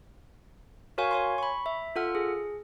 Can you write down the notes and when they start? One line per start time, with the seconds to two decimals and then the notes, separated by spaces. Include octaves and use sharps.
0.98 F#4 A#4 C#5 F5 G#5 C#6
1.11 C#5 G#5 C6
1.38 B5 C#6
1.66 E5
1.96 F4 A4 F#5 F6
2.15 G#4